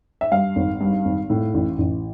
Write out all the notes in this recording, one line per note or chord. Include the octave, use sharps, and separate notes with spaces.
E5
G2 F5
G#1
G2
G#1
A2
A1
A1